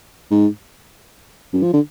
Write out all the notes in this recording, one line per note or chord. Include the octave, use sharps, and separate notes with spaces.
G#2
F#2
F3
D3